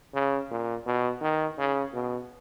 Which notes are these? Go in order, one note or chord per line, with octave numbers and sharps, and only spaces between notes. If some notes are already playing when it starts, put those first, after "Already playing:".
C#3
A#2
B2
D#3
C#3
B2